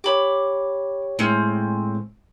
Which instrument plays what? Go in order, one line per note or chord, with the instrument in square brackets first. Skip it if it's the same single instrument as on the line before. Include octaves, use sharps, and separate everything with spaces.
[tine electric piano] G4 C#5 [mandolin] B5 D6
[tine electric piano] A2 G#3 [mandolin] C4 C#4